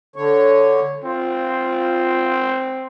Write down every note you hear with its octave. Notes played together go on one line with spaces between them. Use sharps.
D3 C#5
C4 F4